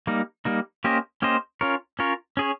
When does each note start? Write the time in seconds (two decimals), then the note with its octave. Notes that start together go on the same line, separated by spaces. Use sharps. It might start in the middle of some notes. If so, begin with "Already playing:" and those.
0.07 G3 A#3 D#4
0.45 G3 A#3 D#4
0.84 A#3 C#4 G4 C5 D#5
1.22 A#3 C#4 G4 C5 D#5
1.61 C#4 F4 A#4 C#5
1.99 C#4 F4 A#4 C#5
2.37 C#4 G#4 C#5